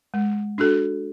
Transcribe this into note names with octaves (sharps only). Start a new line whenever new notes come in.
G#3
D4 F#4 A4